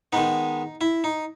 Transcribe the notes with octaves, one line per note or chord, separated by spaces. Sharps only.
D#3 G#3 B3 D#4
E4
D#4